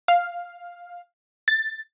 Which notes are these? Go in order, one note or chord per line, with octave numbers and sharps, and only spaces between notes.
F5
A6